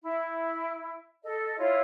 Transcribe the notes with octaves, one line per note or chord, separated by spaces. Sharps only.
E4
A4 D#5
E4 F4 C#5